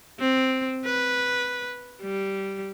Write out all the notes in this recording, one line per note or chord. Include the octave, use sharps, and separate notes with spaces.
C4
B4
G3